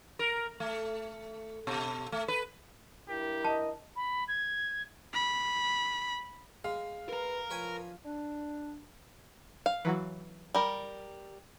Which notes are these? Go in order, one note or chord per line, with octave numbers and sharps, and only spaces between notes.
A#4
A3
B2
A3
B4
G2 E4 G4 A#4
D#5 A5
B5
G#6
B5
G#3 F5
A#4 B4 A#5
F3 B4 C#5 G#5
D4
F5
E3 F#3 F#4
G3 A#4